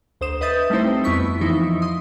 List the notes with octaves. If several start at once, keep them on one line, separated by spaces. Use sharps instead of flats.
D2 C5 D#6 E7
B4 D#5 E5 D#6 G6 A6
G3 A3 C4 D#4 E4 C5
F2 B3 E4 C#6 B6
E3 F3 D#4 E4
C6 D#6